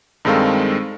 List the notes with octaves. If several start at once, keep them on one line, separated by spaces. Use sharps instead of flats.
G2 D#3 G#3 C4 A4 F5